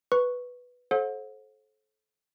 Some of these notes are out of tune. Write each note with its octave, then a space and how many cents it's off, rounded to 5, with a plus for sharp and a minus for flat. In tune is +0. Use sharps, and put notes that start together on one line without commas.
B4 +0 C#6 +0
A4 -30 C5 +35 F#5 -40